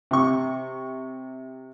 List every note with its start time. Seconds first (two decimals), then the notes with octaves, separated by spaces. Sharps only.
0.11 C3 C#6